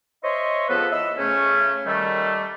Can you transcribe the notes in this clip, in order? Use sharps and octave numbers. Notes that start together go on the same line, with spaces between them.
C5 C#5 D#5 E5 C6 C#6
C#2 F3 B3 A4 B4
E4 D#5 B5 E6
C#3 A3 C#4
D#3 G3 A3